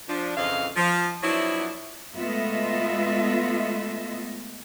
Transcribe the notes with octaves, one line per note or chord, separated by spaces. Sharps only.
F3 D4
F2 C#3 E3 C4 D#5 F5
F3
F3 F#3 B3 D4 E4
G#3 A3 B3 F4 D#5 E5